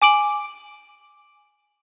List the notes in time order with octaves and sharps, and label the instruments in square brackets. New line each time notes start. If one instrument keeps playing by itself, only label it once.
[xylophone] G#5 D6 D7 F#7